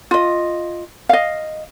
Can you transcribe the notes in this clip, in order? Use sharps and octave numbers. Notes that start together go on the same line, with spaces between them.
F4 D#5
D#5 F5